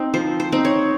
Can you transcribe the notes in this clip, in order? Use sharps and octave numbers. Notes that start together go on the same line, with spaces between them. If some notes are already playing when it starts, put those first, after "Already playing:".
Already playing: C4 D#4
F3 C5
C5
C4 D#4
C#5